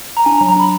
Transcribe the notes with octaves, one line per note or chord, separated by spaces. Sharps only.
A#5
D4 G#5
A#5
F#3
A#5
D4 B5